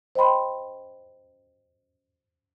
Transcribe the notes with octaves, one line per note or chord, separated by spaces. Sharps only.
C5 D#5 G5 B5 C6